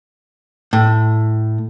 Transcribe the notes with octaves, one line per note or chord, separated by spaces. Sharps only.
A2